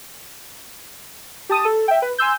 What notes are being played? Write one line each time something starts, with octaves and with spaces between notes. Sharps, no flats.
G4 A5 D#6 D#7
A4
E5 G5
B4
G#5 C6 E6 G6